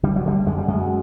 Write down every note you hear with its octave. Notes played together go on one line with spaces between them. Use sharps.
D3 G3
F#3
D3 G3
F#2 G#3
G3
F#2 G#3